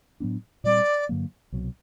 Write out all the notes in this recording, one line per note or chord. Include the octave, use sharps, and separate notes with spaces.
A2 F#3 B3 D4
A#2 G3 C4 D5
G2 D3 F#3 A#3
C2 B2 F#3